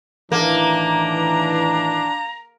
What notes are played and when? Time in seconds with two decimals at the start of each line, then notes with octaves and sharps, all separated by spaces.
0.32 A2 D#3 E3 A#3 D4 A#5